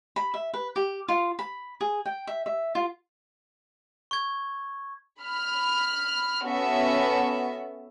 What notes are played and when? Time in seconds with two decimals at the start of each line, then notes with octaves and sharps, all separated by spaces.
0.16 B5
0.34 E5
0.54 B4
0.76 G4
1.08 F4
1.39 B5
1.81 G#4
2.06 G5
2.27 E5
2.46 E5
2.75 F4
4.11 C#6 G#6
5.20 B5 F6
6.44 B3 C#4 F#4 A4 E5